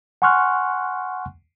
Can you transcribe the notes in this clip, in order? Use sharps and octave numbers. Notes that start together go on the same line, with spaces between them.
F#5 G#5 C6 C#6 F6 F#6